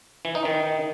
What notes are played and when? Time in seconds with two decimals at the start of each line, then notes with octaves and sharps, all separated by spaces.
0.25 E3
0.35 D#4
0.45 D#3